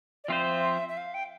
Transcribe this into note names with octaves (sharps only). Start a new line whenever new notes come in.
D5
F3 C4 F4 C5 E5
E5
F5
G5